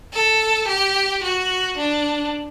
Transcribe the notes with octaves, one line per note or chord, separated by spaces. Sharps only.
A4
G4
F#4
D4